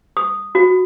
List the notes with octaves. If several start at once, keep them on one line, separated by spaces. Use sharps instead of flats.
D#6
F#4